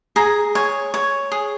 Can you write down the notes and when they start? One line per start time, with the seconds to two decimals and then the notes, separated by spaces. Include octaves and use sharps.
0.16 G#4 A#5
0.55 C#5 G#5
0.94 C#5
1.32 G#4